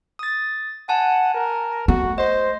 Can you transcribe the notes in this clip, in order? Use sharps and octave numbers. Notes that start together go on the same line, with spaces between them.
D#6 A6
F#5 G#5 A5
A#4
A3 F#4
C5 D#5